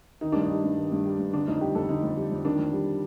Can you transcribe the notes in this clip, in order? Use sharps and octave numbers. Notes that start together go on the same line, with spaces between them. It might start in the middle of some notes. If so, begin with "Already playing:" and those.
D#3 D#4
G2 D4
D#4
G3
G2
D#3
G2
G3
G2
D3 D4
F2 D#4
G3 G4
F2 A4
D3 D#4
F2
G3
F2
D#3 D4
F2
G3